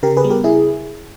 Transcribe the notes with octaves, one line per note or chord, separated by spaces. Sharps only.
C#3 G4 A#4
G#4 B4
G3 B3
G4 A#4
C#3 E4 G#4